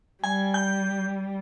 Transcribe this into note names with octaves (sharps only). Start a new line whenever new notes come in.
G3 G#5
G6